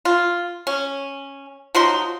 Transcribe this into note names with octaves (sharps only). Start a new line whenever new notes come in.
F4
C#4
F3 F#3 D#4 C6